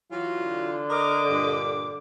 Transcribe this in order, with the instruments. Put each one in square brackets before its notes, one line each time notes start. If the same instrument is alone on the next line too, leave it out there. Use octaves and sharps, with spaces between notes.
[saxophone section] E3 F#3 F#4 [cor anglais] F4
[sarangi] D3
[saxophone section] A#4 [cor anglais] D#5 [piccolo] D6
[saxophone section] G2 A#2